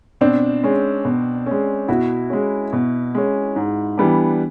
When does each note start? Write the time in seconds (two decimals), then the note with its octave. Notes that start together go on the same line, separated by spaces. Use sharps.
0.21 B2 C4 D4
0.63 G#3 C#4
1.05 B2
1.46 G#3 C#4
1.88 B2 E4 F#4
2.30 G#3 C#4
2.73 B2
3.15 G#3 C#4
3.56 G#2
3.98 E3 G3 B3 D4